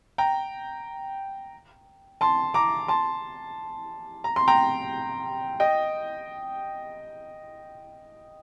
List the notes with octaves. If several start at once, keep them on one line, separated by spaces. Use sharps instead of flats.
G5 A#5
A5 C6
A#5 D6
A5 C6
A#5
C6
G5 A#5
D#5 G5